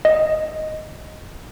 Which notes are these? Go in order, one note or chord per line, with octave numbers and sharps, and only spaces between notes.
D#5